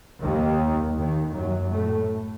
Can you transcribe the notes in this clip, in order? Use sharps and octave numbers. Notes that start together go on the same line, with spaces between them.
D#2 D#3
D#2 D#3
F#2 F#3
A2 A3